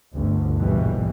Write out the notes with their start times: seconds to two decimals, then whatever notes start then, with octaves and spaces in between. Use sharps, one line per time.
0.13 G1 D2
0.56 A#1 G#2 B2 E3 G3